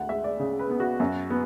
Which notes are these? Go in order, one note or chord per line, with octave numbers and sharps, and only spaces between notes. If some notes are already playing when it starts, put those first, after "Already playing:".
Already playing: D2 F#5
G#3 E5
D5
C#3
B4
B3
F#4
F#2
B3